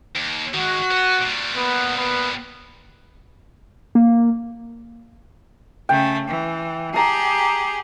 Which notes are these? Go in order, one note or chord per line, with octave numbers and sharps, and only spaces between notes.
D#2
D#3 G#3 F#4
B3
A#2 G3
B3
B3
A#3
C#3 A3 G5
E3
G4 G#4 A5 A#5